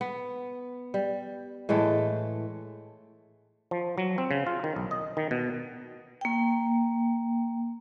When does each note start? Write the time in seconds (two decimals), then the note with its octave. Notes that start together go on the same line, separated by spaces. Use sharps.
0.01 B3
0.94 G3
1.69 A2 E3 G#3 A3
3.71 F3
3.98 F#3
4.18 C4
4.31 C#3
4.47 F4
4.64 D#3
4.76 B1
4.91 D#5
5.17 D#3
5.31 B2
6.21 A#3 G5